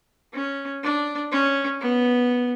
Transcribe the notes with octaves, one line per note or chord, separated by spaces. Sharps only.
C#4
D4
C#4
B3